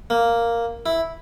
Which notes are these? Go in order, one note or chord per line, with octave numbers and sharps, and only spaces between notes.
A#3
E4